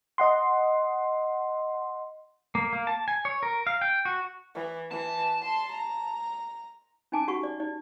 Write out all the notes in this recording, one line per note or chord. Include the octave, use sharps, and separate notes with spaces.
D#5 F#5 C6
A#3
A#3
A5
G#5
C#5
A#4
F5
G5
F#4
E3
E3 A5
C6
A#5
C#4 D#4 G#5 A5 D6
F#4 G4 F#5 C#6
D5
D#4 D5